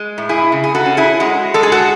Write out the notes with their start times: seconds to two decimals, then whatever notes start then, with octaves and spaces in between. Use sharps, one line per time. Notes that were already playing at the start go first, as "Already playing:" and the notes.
Already playing: G#3
0.18 A2
0.29 E4 G#4
0.52 C#3
0.64 G#4
0.75 F#4 A4
0.86 C#4
0.97 E4 G#4
1.20 G#3 F#4
1.54 G#3 A4
1.63 G#4
1.72 F#4 A4